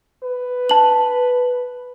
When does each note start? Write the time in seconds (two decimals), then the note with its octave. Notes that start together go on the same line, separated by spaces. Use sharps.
0.23 B4
0.69 A5 F#7